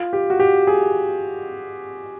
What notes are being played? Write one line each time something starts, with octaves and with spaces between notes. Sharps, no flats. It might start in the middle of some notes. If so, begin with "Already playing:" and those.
Already playing: F4
G4
F#4
G4
G#4